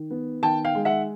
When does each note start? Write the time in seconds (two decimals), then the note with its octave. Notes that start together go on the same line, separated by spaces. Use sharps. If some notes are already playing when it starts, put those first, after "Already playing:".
Already playing: D#3
0.11 B3
0.42 D#3 G5 A5
0.65 F5 G5
0.75 G#3
0.85 E5 F#5